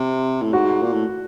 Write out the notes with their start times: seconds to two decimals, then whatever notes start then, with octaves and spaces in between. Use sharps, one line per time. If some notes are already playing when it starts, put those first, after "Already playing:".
Already playing: C3
0.42 A2
0.53 G#2 F#4
0.82 A#2
0.93 A2